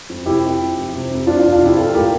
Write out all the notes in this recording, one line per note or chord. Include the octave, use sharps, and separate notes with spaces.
F2
C3 E4 G4
F2
F3
F2
C3
F2
F3 D4 F4
F2 D4 F4
D4 F4
C3
E4 G4
F3 F4 A4
A2 G4 A#4